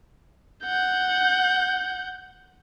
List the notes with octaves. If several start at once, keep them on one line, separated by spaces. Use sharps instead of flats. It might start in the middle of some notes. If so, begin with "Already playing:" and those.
F#5 G6